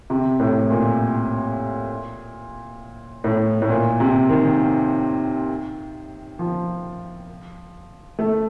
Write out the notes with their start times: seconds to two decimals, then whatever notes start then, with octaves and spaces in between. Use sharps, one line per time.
0.10 C3
0.40 A2
0.70 A#2
3.24 A2
3.62 A2
3.70 A#2
4.00 C3
4.29 D#3
6.39 F3
8.19 A3